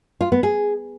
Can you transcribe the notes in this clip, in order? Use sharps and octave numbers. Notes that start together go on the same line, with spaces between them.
F4
B3
G#4